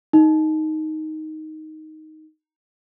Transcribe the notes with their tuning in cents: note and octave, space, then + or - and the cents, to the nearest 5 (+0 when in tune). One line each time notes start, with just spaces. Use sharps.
D#4 +5